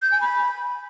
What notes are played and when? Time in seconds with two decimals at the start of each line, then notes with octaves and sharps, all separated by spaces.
0.02 G6
0.12 G#5
0.21 B5